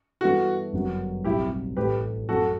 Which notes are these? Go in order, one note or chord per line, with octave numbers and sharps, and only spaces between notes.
G2 E3 B3 E4 F#4 A4
G1 F#2 F#3 B3 F#4
B1 A2 G3 C4 E4 G4
A1 A2 E3 A3 G4 B4
F#2 F#3 A3 F#4 A4